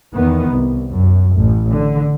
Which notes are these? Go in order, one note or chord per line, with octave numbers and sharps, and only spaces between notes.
E2 D#3 B3
C2
F#2
A1
D3